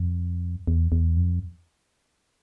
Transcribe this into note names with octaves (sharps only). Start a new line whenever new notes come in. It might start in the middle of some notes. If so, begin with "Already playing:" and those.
Already playing: F2
E2
E2
F2